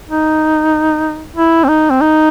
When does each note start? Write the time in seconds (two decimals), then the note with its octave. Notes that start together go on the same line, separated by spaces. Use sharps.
0.09 D#4
1.36 E4
1.64 C4
1.68 D#4
1.90 C4
2.01 D#4